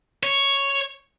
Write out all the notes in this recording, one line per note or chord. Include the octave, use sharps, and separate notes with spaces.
C#5